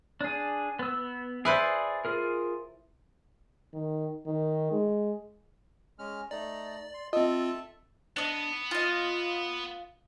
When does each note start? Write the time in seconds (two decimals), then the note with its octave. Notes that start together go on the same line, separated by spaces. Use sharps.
0.21 D4 G#4
0.79 B3 E6
1.45 E4 G#4 B4 C5 D5
2.05 F4 G#4 A#4
3.74 D#3
4.26 D#3
4.71 G#3
5.99 G#3 C#4 F6
6.31 A3 D#4 D5 A#5
6.94 C6
7.13 C4 F4 A4 D#5 E5 A5
8.17 B3 D4 D#5
8.71 F4 D#5